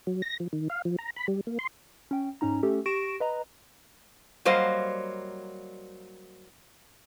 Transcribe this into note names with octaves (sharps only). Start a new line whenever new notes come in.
F#3
A#6
F3
D#3
F5
F3
A#5
B5
G3
A#3
C6
C#4 G5
G#2 C#4 D#4 A#5
A3 C#4 G4 A4
G4 C#6 A#6 D7 E7
B4 D#5 A#5
F#3 G3 A#3 C5 D#5 F5